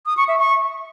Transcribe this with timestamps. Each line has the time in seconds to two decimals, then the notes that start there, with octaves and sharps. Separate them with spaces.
0.06 D#6
0.17 C#6
0.28 E5
0.39 C#6